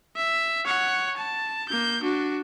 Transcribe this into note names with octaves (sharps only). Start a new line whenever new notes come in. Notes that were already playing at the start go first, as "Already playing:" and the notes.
E5
C#5 F#5
A5
A#3 G6
D4 F#4